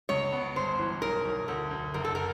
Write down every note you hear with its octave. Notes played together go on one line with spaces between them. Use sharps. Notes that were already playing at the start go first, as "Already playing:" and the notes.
C#2 C#5
B3
G1 C5
E3
B1 A#4
B1
D2 A4
D2
F#1 A#4
A4
A#4